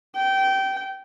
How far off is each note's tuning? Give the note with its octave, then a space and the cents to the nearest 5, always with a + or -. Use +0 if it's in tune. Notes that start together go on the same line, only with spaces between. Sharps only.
G5 -20